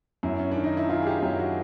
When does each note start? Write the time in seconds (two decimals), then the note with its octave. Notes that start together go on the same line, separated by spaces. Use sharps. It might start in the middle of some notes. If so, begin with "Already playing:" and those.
0.23 F#2 E4
0.40 C#4
0.51 D#3 D4
0.64 D#4
0.77 E4
0.89 D#3 F4
1.02 G#4
1.07 G4
1.22 F#2 G4
1.39 F#4